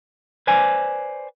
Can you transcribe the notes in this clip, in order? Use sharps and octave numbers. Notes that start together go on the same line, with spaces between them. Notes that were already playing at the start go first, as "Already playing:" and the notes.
B4 C5 D5 G#5